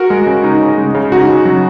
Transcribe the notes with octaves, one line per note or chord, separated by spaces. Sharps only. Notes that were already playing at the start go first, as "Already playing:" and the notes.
Already playing: F#4 A#4
G#3
C#3
D#4
C#3
G#3
C#3
D#4 F#4
C#3
F#3